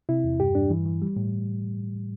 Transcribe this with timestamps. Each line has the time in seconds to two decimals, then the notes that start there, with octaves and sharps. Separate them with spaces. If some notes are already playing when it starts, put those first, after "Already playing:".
0.09 C3 E4
0.24 E2
0.40 G2 G4
0.55 G2 D4
0.70 E3
0.85 E3
1.02 G3
1.16 A2